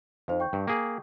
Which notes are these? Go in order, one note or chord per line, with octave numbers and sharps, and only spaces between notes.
F2 D#4 C5 F5
G5 C#6 G6
G2
A#3 G#4